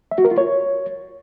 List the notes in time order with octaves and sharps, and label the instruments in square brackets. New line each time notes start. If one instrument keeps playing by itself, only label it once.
[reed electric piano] E5
F#4
A#4
F4
C#5